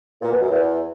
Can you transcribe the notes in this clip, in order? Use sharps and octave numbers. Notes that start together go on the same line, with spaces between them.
A#2
B2
F#2
E2